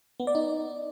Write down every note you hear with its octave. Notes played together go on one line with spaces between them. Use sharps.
B3
D5
D#4